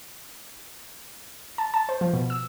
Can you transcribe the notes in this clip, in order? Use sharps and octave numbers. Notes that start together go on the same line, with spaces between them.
A5
A5
C5
F3
B2
E6